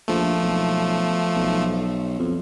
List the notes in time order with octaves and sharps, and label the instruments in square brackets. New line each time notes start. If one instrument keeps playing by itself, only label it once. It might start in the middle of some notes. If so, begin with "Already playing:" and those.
[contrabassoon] A#1 [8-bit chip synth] F3 A3
[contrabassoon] B1
B1
F2